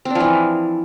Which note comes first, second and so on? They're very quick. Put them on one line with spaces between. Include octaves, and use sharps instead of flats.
C4 D4 F3 E3